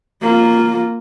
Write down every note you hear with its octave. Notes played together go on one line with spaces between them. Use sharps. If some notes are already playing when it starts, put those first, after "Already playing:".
A#3 F4